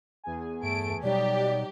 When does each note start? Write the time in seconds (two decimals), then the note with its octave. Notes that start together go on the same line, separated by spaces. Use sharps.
0.24 E2 G#4 G#5
0.63 G2 A3 D7
1.03 B2 F#3 G3 D#4 G4 D5